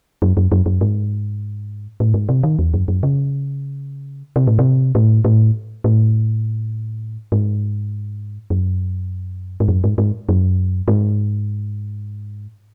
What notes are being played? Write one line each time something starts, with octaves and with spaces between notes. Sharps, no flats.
F#2
F#2
F#2
F#2
G#2
A2
G#2
C3
D#3
E2
F#2
F#2
C#3
C3
A2
C3
A2
A2
A2
G#2
F#2
G#2
F#2
G#2
G#2
F#2
G#2